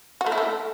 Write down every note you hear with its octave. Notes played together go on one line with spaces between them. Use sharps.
F#4
A3
E4
A3